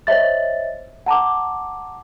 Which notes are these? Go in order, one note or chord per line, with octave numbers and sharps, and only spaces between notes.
C5 C#5 D#5 E5 A6
F#5 A5 A#5 D6